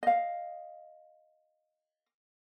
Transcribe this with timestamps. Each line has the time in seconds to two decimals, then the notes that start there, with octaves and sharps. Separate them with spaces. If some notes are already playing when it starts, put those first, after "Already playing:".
0.03 D#5 F5